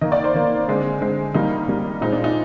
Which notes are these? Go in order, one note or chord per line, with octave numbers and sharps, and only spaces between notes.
D#3 A#3 D#5
D5
C5
D#3 A#3
D3 G#3 C4
D3 G#3 C4
D#3 G3 A#3 D#4
D#3 G3 A#3
A#2 G#3 C4 D#4
D4
D#4